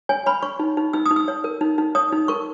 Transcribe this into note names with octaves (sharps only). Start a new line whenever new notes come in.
C#5 G#5
C#5 B5
C#5 C#6
D#4
D#4
D#4 E6
D#6
D#4
E6
C#5
A#4
D#4
D#4
C#5 D#6
D#4
A#4 C#6